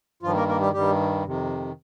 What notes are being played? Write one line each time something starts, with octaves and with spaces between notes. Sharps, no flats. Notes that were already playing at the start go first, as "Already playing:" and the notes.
G2 D#3 F3 F4
A#3 A#4
A#3 A#4
G3 G4
G2 D#3 G3 G4
F2 C3 D#3